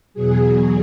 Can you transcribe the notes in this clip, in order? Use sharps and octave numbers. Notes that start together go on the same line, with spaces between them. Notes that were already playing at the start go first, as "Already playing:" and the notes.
E2 B2 F#3 G#4
G#4